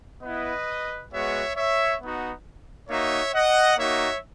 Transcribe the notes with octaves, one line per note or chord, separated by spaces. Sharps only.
B3 E4 B4 D#5
G#3 B3 F#4 C#5 E5
C#5 E5
B3 D#4 F#4
A#3 D#4 F#4 C#5 E5
D#5 F#5
A#3 D#4 F#4 C#5 E5